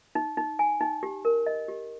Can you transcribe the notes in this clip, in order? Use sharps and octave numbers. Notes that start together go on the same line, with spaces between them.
D#4
D#4
G#5
D#4
G4
A#4
D#5
G4